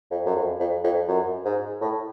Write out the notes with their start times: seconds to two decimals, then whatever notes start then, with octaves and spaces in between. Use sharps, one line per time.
0.11 F2
0.26 F#2
0.35 F2
0.60 F2
0.84 F2
1.08 F#2
1.45 G#2
1.81 A2